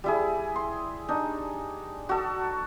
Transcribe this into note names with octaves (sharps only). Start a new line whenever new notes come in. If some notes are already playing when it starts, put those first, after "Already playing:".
G3 E4 G#4
C6
D4 D#4
F#4 A4